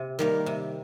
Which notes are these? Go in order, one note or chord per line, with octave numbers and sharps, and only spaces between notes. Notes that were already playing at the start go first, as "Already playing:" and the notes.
Already playing: C3
D#3 G3 A#3
C3